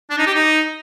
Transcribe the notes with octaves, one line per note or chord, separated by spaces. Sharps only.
D4
D#4
G4
D#4